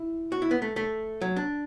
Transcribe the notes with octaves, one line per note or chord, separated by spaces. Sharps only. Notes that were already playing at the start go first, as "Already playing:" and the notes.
Already playing: E4
F#4
E4
B3
A3
A3
F#3
D4